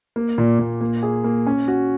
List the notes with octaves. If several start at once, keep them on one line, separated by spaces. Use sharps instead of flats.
A#3
A#2
A#2
A#3
G#4
A#3
C#4
F#4